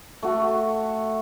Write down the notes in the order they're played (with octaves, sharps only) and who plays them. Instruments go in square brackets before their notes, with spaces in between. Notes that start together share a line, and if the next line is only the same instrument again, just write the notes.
[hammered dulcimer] A3 F#4